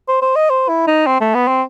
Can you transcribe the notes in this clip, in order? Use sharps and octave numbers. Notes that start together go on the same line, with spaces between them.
C5
C5
D#5
C5
E4
D#4
C4
A3
B3
C4